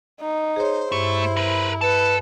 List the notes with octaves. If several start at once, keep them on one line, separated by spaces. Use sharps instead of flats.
D#4
G#4 C5 C#5
G2 A3 E4
A#4 B4
A4 B4 A5